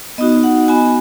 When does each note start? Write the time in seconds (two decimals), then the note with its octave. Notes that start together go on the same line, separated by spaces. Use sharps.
0.18 B3 D#4 F#4 D#5
0.43 F#5
0.68 B3 F#4 G#5